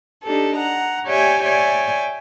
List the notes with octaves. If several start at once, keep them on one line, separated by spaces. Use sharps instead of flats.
D4 D#4 G4 A4
F#5 A#5
G4 C#5 D5 E5 G5 G#5
C#5 D5 E5 G5 G#5